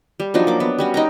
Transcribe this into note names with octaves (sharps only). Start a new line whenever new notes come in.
G3
F3 F#3 D4 D#4
A#3 D6
B3
G3 C#4 F#4
D#4 G5 A#5